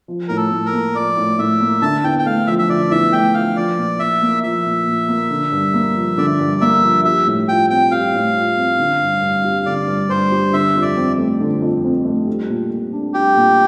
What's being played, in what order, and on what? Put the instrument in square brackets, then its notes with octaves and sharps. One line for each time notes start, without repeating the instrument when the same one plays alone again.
[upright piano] F3
[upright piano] A2 [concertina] A#4
[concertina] A4
[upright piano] A2
[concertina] A#4
[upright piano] A#3
[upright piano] F3 [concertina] D5
[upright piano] A2
[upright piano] A2 [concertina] E5
[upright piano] A#3
[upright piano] D3 [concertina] A5
[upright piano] E2 [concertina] G5
[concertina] G5
[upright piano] A3 [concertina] F5
[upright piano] F3 [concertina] E5
[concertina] E5
[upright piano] D3 [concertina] D5
[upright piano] E2 [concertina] E5
[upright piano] A3 [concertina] G5
[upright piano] F3 [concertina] F5
[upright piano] F3 [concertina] D5
[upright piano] A#2
[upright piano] A#2 [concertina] E5
[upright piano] A#3
[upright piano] F3 [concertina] E5
[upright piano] A#2
A#2
A#3
D3
G2
A#3
F3
[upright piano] D3 [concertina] D5
[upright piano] G2
[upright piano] A#3 [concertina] E5
[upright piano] F3
[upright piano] G3 [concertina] E5
[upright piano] A2
[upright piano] F4 [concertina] G5
[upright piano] C4 [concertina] G5
[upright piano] G3 [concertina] F5
[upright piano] A2
F4
C4
D3
G2
G2
G3
[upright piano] D3 [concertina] D5
[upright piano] G2
[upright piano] G2 [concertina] C5
[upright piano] G3
[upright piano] D3 [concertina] E5
[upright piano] F2
[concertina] D5
[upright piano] C4
A3
D3
F2
C4
A3
G3
A#2
A#2
D4
[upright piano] G3 [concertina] G4
[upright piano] A#2